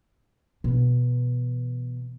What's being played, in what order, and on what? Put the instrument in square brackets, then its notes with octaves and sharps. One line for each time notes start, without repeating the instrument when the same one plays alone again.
[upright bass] B2 E3